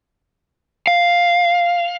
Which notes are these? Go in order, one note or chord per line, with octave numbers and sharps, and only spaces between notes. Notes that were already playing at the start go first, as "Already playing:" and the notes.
F5